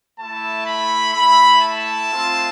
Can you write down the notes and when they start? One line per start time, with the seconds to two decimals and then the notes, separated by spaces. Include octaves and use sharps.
0.18 A3 E4 A5
0.66 B5
1.14 A3 E4 B5
1.61 A5
2.10 A3 C4 F4